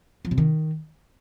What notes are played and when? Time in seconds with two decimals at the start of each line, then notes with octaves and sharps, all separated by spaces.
0.25 F3
0.31 C3
0.38 D#3